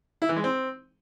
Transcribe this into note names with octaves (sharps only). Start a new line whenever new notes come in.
E4
E3
G#3
C4